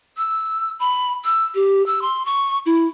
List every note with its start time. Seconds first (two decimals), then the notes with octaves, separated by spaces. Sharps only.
0.17 E6
0.80 B5
1.25 E6
1.55 G4
1.86 E6
2.02 C6
2.25 C#6
2.66 E4